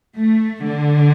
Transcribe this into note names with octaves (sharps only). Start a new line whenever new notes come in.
A3
D3